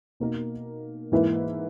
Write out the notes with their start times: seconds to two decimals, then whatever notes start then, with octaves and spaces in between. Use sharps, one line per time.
0.20 B2 A#3 D#4 A#4
1.12 G#2 E3 A#3 E4 B4